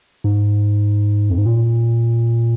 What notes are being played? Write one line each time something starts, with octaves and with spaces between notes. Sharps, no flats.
G#2
F2
G#2
A#2